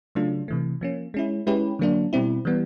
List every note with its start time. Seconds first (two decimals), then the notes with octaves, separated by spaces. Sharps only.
0.15 C#3 F#3 A3 D4 F4
0.48 C3 E3 A3
0.81 F3 A#3 C#4
1.14 G#3 C#4 E4
1.47 G#3 C#4 E4 G4 B4
1.79 D3 F#3 A#3 D4
2.13 B2 G3 C4 E4
2.45 E3 G3 B3